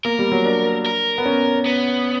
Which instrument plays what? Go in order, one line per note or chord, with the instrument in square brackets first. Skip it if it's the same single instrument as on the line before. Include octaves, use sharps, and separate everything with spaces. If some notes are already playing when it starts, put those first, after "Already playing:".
[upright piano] A#3 [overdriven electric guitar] A#4
[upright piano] G3
F#3
D4
[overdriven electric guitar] A#4
[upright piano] B3
C#4
[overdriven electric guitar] B3